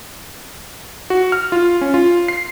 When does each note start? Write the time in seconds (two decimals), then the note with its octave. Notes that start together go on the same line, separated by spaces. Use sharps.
1.10 F#4
1.32 F6
1.52 F4
1.81 C#4
1.94 F4
2.28 C7